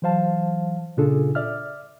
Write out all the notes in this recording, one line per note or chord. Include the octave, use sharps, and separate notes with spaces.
E3 F#3 C5 F5 A5
A#2 C#3 D4 F4 G#4 A4
D5 E5 F6